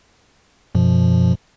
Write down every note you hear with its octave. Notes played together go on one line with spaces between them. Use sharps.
F#2 B2 F3